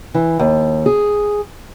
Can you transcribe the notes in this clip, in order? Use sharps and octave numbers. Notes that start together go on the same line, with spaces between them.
E3
D#2
G#4